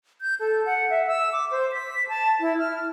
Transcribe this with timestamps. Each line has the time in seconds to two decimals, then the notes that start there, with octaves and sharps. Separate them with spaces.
0.21 G6
0.40 A4
0.66 F#5
0.90 E5
1.07 E6
1.32 D6
1.51 C5
1.72 B6
2.09 A5
2.41 E4
2.58 F6